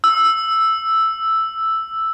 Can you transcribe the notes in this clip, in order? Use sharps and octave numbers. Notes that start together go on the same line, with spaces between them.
E6